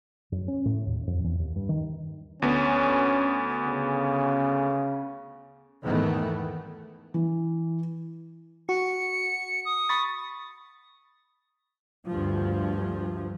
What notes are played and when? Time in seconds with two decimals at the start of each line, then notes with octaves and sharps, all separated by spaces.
0.32 F#2
0.48 C#4
0.65 A2
0.86 D#2
1.07 F2
1.24 E2
1.39 D#2
1.56 G2
1.69 D#3
2.42 D2 B3 C#4
3.66 C#3
5.83 E2 G#2 D#3 E3 A3 B3
7.14 E3
8.69 F#4 C#7
9.65 D#6
9.89 B5 C#6 A6
12.07 D2 G2 F3